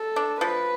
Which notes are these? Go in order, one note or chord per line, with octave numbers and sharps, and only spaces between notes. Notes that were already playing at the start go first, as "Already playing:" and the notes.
Already playing: A4
D4
F3 B4